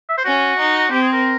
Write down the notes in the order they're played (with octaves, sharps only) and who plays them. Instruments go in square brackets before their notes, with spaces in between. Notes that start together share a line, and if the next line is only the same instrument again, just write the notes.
[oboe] E5
C5
[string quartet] C#4 [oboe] F#4
[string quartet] D#4
[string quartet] C4 [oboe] G4
[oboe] G#4
A#4